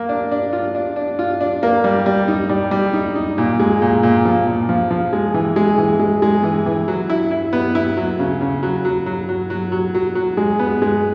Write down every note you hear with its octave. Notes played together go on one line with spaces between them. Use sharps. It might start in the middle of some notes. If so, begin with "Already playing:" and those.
Already playing: A#3
D4
D4
F4
D4
D4
F4
D4
A#3
G3
G3
D#4
G3
G3
D#4
D#4
A#2
G#3
A#2
A#2
F3
A#2
F3
F3
G#3
E3
G#3
E3
G#3
G#3
E3
E3
F#3
E4
E4
B3
E4
F#3
C#3
C#3
F#3
F#3
F#3
F#3
F#3
F#3
F#3
F#3
G#3
B3
G#3